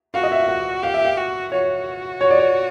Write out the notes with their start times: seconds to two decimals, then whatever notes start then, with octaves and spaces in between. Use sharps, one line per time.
0.14 F#4 F5
0.23 D#5
0.32 E5
0.40 F5
0.48 F#5
0.83 G4 F5
0.94 E5
1.05 F5
1.18 F#4
1.52 F#4 C#5
2.21 C#5
2.31 D5
2.39 C#5